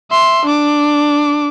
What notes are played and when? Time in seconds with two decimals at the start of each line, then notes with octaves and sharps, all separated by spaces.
0.11 E5 C6
0.45 D4 D6